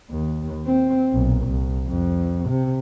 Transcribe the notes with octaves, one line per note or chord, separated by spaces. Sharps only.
D#2
C4
B1 A#2
C2
F2
C3